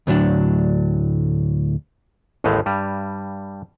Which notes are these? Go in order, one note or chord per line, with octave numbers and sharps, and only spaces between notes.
D2 A2 F#3 D4
A1 D#2 A2 G#3 A3
G2 G3